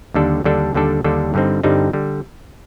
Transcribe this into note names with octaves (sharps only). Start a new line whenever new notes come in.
D#2 D3 G3 D4 A4
D#2 D3 G3 D4 A4
D#2 D3 G3 D4 A4
D#2 D3 G3 D4 A4
G2 D3 G3 C4 D#4
G2 D3 G3 C4 D#4
D3 G3